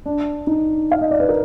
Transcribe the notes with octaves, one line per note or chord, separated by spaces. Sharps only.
D4
D#4
F5
D#5
D5
B4
A#4